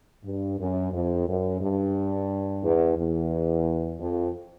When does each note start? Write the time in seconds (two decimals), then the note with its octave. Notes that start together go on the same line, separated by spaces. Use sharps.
0.24 G2
0.59 F#2
0.92 F2
1.27 F#2
1.61 G2
2.63 E2
2.97 E2
3.99 F2